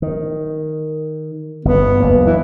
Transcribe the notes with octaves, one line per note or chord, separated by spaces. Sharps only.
D#3
G1 B3
F#1 D2 A#3
E3